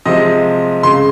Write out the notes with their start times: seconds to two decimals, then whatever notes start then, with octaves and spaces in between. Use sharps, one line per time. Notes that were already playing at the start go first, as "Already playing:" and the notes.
0.05 C3 F3 G#3 D#5
0.83 C#3 G#3 C6